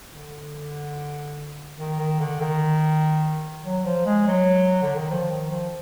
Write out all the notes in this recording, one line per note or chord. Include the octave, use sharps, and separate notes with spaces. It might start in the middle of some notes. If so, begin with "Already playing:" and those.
D3
D#3
D#3
D3
D#3
F#3
F3
G#3
F#3
D3
D#3
F3
D#3
F3